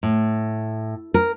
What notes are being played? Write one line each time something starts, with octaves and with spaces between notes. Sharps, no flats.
A2
A#4